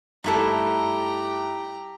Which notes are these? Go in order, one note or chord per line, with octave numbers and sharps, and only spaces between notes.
G2 A3 D#4 E4 G4 A4 A#5